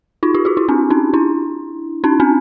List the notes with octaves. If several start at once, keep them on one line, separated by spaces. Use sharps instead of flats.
D#4 F4
F4 G4
F#4 G#4
E4 F#4
C4 D4
C#4 D#4
D4 E4
C#4 D#4
C4 D4